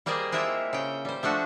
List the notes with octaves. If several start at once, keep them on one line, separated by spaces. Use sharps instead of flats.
G3 A#3 G#4 C5 D5 D#5
G#3 C4 E4 F4 E5
C#3 G5
G3 C5
F3 A3 D4 F#4